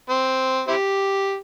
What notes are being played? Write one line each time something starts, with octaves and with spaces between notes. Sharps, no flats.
C4
C4 E4 G4